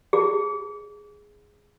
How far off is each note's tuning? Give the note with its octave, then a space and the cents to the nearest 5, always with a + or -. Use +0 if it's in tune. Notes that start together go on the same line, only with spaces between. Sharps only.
G#4 +0